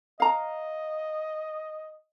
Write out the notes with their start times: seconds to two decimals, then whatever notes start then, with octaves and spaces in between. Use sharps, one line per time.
0.20 D#5 F5 A#5